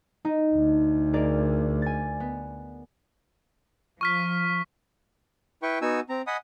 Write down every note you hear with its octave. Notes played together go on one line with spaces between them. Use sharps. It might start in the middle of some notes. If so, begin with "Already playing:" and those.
D#4
D2
G#4 A#4 D5
G#5 A6
B3
F3 C#6 F6 B6
E4 B4 G5 C#6
B3 D#4 F#4 G#5 E6
C4 A#5
D#5 F#5 G#5 B5 D#6